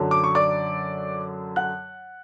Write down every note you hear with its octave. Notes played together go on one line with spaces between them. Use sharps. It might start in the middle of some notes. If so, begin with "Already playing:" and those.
Already playing: F#2 D3 F#3
D6
C#6
D5 D6
F#5 F#6